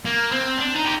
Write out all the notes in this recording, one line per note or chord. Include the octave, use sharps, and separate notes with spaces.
A#3
C4
D4
D#4
G4